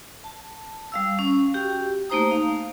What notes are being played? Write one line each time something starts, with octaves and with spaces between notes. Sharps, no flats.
A5
G3 F5 E6
C#4
F#4 G4 G5
A3 A#3 D#4 C5 A#5 D#6
F5